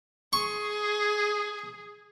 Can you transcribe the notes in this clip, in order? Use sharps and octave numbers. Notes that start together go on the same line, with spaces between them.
G#4 C#6